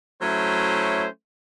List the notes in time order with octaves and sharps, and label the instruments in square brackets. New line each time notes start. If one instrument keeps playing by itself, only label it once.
[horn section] F#3 A3 C#4 E4 C5